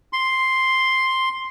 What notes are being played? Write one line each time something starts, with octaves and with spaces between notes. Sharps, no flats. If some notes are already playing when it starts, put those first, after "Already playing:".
C6